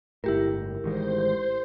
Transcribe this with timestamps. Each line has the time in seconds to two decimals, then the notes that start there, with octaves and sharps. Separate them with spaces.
0.24 G1 A2 E4 G4 A#4
0.84 A1 D#3 G#3 C5